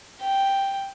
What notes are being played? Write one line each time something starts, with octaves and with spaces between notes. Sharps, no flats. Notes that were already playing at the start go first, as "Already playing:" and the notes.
G5